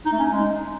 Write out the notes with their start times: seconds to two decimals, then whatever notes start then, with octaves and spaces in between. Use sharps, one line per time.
0.06 D#4
0.12 A3
0.19 C#4
0.26 D#4
0.32 G#3